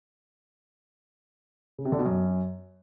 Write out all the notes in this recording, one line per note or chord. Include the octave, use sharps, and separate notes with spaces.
C#3
C3
D3
B2
F#2